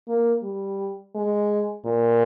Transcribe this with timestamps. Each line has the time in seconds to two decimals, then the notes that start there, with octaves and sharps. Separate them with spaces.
0.08 A#3
0.43 G3
1.15 G#3
1.86 A#2